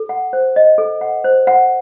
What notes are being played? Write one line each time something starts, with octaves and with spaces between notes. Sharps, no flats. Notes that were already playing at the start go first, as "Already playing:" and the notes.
Already playing: A4
F#5
C5
D#5
A4
F#5
C5
F#5